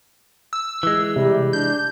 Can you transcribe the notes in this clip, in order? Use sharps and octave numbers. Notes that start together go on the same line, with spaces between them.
E6
E3 G#3
C3 G3
D4 G6